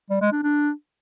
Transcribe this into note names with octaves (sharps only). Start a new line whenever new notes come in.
G3
G#3
D4
D4